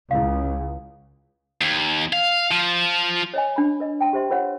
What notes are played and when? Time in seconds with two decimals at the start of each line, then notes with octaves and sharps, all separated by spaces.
0.11 C#2 E4 F5
1.61 D#2
2.13 F5
2.52 F3
3.34 C#5 D#5 G#5
3.56 D4 B5
3.80 B4 D#5
4.01 G5 A5 C6
4.13 G4 C5 E5 C6
4.30 F4 G4 B4 C#5 F#5